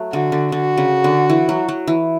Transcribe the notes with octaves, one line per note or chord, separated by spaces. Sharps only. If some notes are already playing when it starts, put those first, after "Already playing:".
Already playing: F#3 A3
D3 F#4
D3
D3 F#4
C#3
D3
E3
F#3
F#3
E3